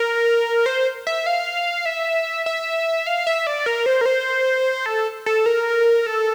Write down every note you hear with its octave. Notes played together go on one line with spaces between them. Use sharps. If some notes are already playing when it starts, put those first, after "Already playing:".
Already playing: A#4
C5
E5
F5
E5
E5
F5
E5
D5
A#4
C5
A#4
C5
A4
A4
A#4
A4